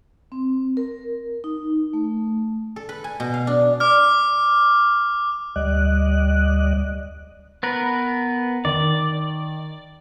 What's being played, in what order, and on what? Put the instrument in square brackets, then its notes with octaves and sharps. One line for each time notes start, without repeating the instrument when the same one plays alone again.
[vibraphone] C4
A#4
D#4
A3
[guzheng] A4
B4
G#5
B2
F5
D4
[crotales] D6 F6
[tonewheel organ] D2 G3 D5 D#5 F#6
[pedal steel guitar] B3 A#4 B4
[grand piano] D#3 [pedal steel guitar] D5